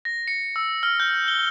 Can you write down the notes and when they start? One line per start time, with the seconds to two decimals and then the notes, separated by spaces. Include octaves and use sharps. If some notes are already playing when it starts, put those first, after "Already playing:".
0.05 A#6
0.28 C#7
0.56 E6
0.83 F6
1.00 G6
1.28 G7